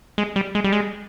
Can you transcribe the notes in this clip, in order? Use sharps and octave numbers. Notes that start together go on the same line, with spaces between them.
G#3
G3
G#3
G3
G#3